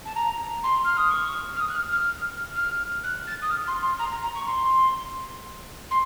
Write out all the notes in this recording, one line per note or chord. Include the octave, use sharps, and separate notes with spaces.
A5
A#5
C6
F6
D#6
C#6
F6
D#6
F#6
F6
F6
F6
F#6
A6
D#6
F6
C6
C6
A#5
A#5
A#5
C#6
C6
C6